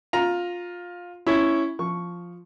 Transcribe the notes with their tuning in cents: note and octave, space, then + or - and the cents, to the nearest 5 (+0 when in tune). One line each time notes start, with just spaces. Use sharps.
F4 +15 A#5 +5
C#4 +0 E4 +0 C#5 +0
F3 +0 C#6 +0